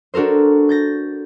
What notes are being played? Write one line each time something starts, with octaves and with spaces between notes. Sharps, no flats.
D4 F#4 A4 A#4 C5
G6 A6 A#6